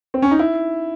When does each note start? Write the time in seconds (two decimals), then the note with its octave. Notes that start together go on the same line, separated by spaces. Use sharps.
0.14 C4
0.22 C#4
0.31 D#4
0.39 E4